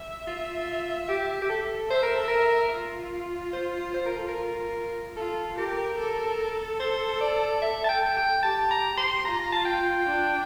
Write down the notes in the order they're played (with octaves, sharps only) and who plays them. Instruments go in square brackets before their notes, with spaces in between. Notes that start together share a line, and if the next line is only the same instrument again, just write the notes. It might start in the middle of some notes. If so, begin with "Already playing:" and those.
Already playing: [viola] E5
[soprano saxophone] F4
G4
G4
A4
[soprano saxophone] C5 [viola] E5
[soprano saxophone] A#4
A4
A#4
[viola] F4
[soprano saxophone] C5
C5
A#4
A4
A#4
[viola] F4 [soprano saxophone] A4
[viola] G4 [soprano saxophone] A#4
[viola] A4
[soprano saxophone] C5
D5
E5
A5
G5
G5
[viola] G4 [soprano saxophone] A5
[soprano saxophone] A#5
C6
[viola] F4 [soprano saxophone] A#5
[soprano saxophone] A#5
A5
G5
[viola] D4